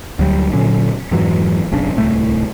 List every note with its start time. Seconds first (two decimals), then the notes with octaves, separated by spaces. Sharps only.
0.19 D2 F#3 G3
0.53 A#2 D3 F#3 C#4
1.11 F2 G#2 E3 F#3
1.72 F#1 B1 C#3 D4
1.97 D1 C2 A2 A3